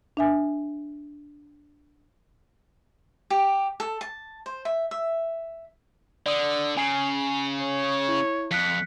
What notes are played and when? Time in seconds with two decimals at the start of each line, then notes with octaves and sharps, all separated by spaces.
0.17 D4 E5 G#5
3.30 G4
3.80 A4
4.01 A5
4.46 C5
4.65 E5
4.91 E5
6.26 D3 D5 D#6
6.77 C#3 G#5 C7
7.62 C#5
8.08 E4
8.51 F2 F#6 B6 C#7